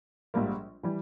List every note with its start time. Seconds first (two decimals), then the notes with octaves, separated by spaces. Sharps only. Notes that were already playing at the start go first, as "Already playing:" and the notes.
0.34 A#1 G#2 G3 A#3
0.83 E3 G3